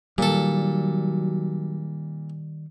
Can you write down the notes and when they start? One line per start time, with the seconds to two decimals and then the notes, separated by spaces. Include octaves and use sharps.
0.18 A#2 D#3 F#3 G3 A4